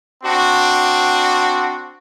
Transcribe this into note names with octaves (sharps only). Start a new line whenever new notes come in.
C4 D4 F#4